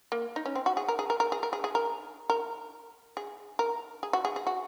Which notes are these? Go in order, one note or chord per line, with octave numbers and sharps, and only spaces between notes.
A#3
D#4
C#4
C4
F#4
G#4
A#4
G#4
A#4
A#4
G#4
A#4
G#4
G#4
A#4
A#4
G#4
A#4
G#4
F#4
G#4
G#4
F#4